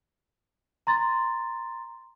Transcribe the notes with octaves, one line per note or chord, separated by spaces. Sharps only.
A#5 C6 A6